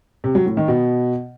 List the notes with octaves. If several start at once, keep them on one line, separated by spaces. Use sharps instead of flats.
C3
F#3
A2
D#3
B2